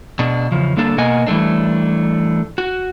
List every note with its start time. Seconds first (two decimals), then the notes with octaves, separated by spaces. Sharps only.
0.19 B2 D4
0.52 E2 C#3 F3
0.77 D3 G3 A#3 D4 A4
0.98 B2 A#3 B3 D#5 F#5 G#5
1.27 E3 G3 A3 D4
2.58 F#4